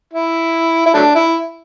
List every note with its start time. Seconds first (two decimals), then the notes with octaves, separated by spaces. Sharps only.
0.14 E4
0.86 E4
0.94 F#3 A3 D4
1.15 E4